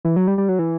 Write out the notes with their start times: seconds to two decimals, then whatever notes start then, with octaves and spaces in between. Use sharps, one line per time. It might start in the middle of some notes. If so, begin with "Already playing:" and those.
0.05 E3
0.16 F#3
0.27 G3
0.38 G3
0.49 F#3
0.59 E3